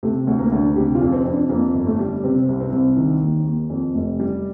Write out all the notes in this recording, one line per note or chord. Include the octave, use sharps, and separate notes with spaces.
C3 A3
D2
A#3
D2
D4
C3 G4
F4
F2
C4
F2
D4
F2 A#3
G1
A3
G3
C3 C4
C2
C4
C2
D#3
D#2
D#2
F2
F1
G3